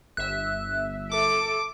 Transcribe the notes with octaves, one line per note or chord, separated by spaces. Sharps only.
G1 E5 F#6
A4 D6 D7